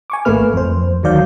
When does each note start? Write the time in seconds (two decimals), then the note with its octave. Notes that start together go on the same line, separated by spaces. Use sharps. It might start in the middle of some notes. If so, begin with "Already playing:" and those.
0.10 G#5 C#6 D6
0.25 G#1 A3 A#3 B4 F6
0.54 F2 C5
1.03 D2 D#3 F#3 D5 F5 G6